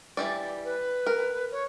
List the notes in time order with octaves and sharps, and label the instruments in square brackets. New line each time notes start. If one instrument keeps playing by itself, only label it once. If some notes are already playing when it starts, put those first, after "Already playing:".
[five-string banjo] E3 G3 D5
[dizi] B4
[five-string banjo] A#4
[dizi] C#5